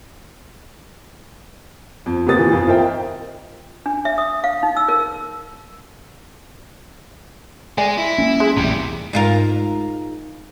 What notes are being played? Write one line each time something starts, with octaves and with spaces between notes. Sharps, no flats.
F2
C3 A#3 B3 G4 D#6 A6
A#2 D#3 E3
F2
F4 A#4 C5 D#5 E5 G5
D4
E5
D#6
F5
D#4
E6
A#4
G#3 D5 G#5
E4
A#3 B3 C#4
G#3
A#1 E2 A2 C3 G3
G#2 F4 A#4